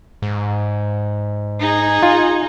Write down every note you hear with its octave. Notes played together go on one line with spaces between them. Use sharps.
G#2
D#4 G#4
F4